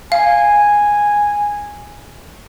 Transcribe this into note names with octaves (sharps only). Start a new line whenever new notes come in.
F5 G#5